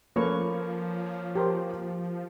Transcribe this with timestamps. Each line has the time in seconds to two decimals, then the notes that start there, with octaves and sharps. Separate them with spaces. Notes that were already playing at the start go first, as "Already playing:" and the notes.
0.16 F3 A#3 C#4 A4 B4 C#5 C#6
1.35 G4 A#4 C5